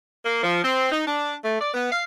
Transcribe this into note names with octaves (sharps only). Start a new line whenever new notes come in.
A#3
F3
C4
D#4
D4
A3
D5
B3
F5